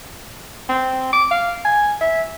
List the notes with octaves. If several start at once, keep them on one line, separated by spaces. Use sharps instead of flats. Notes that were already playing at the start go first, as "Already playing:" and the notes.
C4
D6
F5
G#5
E5